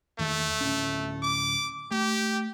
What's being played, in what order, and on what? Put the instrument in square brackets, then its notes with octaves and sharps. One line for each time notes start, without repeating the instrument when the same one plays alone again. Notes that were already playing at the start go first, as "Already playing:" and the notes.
[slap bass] E2 D#3 [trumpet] A3
[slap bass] D1 C#4
[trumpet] D6
[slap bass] A3 [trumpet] G4